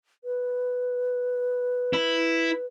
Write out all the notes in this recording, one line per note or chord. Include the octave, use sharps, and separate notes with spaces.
B4
E4